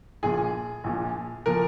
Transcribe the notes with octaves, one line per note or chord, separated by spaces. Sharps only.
A#1 A#2 F3 G#4
A#1 A#2 F3
A#2 F3 A#4